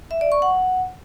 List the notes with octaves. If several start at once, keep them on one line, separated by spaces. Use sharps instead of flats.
E5
D5
C#6
F#5